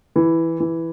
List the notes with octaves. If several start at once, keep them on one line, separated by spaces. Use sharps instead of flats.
E3
E3